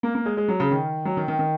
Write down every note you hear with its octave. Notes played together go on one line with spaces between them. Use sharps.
A#3
A#3
G#3
G#3
F#3
C#3
D#3
F#3
D#3
D#3
D#3